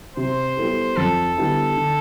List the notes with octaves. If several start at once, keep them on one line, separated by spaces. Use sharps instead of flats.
C3 C5
G3 B3 E4 A4
F2 A4
D3 G3 B3 E4
D3